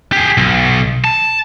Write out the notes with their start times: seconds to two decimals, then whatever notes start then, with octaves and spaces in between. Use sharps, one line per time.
0.12 G4 G#4
0.37 B1
1.04 A5